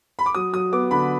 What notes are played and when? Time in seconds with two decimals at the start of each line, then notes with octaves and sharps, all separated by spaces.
0.19 B5
0.26 D6
0.35 F#3 D#6
0.53 F#3 D#6
0.72 B3 D6
0.91 D3 B5